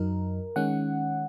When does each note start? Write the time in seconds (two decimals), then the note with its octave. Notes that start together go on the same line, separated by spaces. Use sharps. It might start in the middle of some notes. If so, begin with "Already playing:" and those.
Already playing: F#2 F#3 D#4 A#4
0.56 D#3 G#3 C#4 F#5